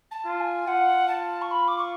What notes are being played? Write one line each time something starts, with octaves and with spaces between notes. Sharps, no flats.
A5
F4
G#5
F4 F#5
A5
C#6
B5
D6
C#6